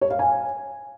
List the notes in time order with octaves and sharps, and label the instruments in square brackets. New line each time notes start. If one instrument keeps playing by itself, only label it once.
[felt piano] C#5
F5
G#5